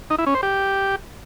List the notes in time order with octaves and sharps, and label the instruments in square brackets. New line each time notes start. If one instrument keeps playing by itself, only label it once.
[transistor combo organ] D#4
E4
C#4
C5
G4